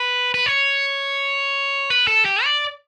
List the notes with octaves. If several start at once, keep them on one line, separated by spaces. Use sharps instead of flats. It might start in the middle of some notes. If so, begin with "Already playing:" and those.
Already playing: B4
B4
C#5
B4
A4
G4
D5